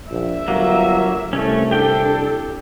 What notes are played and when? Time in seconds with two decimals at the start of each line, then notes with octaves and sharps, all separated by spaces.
0.10 A#1 E5
0.48 G1 F#3 A#3
1.33 C2 A3 C#4
1.71 D4 G4 A4 G5